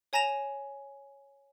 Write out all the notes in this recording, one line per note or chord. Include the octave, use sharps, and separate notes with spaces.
C#5 G#5 A#5 A#6 E7 F7